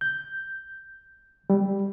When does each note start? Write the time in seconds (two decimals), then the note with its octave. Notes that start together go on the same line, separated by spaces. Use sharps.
0.01 G6
1.50 G3